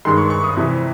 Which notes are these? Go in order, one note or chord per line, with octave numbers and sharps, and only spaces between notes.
G2 D#3 G#3 C6
C#6
C#6
D#6
F2 C3 E3